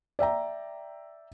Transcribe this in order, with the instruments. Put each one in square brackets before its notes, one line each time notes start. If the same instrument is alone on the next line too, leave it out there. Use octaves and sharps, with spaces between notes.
[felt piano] D5 E5 G5 A#5